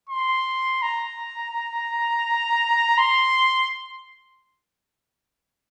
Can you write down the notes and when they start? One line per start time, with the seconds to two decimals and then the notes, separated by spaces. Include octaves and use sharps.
0.09 C6
0.82 A#5
2.98 C6